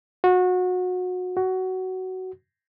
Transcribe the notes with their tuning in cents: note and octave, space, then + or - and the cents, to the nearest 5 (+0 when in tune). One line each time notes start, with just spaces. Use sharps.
F#4 -25
F#4 +15